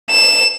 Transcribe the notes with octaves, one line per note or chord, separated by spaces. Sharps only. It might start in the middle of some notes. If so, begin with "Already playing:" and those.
E7